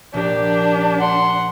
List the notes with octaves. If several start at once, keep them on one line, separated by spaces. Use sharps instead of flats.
A#1 D4 G4
F#5 C6